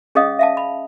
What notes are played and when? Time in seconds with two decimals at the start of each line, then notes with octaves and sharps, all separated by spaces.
0.15 C#4 G#4 C#5 D#5 F5 D#6
0.39 E5 F5 A5
0.57 B5